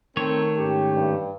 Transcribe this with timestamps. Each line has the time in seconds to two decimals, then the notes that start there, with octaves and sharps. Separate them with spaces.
0.17 D#3 A3 C4 A#4 C#5
0.58 G#2 C#4 G4
0.94 G2